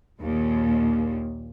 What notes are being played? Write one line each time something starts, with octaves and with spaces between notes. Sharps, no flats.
A#1 D#2 A#2